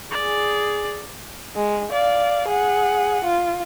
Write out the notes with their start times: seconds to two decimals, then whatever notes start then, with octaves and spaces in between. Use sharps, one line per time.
0.11 G#4 D5
1.56 G#3
1.92 D5 F5
2.47 G#4 F#5
3.24 F4